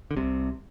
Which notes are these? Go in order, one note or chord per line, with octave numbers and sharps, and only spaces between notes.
D3
C2 C3